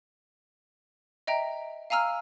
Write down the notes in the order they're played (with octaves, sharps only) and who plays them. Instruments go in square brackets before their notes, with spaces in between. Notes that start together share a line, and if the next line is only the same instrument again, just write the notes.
[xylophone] D#5 E5 G5 A#5
F5 G#5 A#5 E6 F6